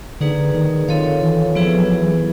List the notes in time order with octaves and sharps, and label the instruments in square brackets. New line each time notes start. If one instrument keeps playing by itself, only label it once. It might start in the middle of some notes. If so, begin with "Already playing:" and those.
[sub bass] D3 [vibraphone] A#3 D#4 G#4 B4 D5
[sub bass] D#3
[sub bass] D#3 [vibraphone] C4 F4 A4 C#5 F5
[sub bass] E3
[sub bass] F3 [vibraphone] B3 E4 G#4 B4 E5
[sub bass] F#3
E3